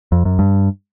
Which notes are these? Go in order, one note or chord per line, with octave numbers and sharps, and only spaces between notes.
F2
F#2
G2